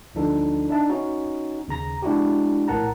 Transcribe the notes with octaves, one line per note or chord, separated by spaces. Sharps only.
D2 F3 D4 D#4 A4
D4 D#4 E5 A5
C#4 D#4 F#4
D#2 C#3 A#5 A#6
G#3 D4 E4 F#4 G4
A#1 A2 A#4 F#5 A5 A#5